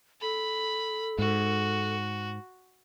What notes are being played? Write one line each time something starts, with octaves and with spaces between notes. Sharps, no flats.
A4 B5
G#2 F#4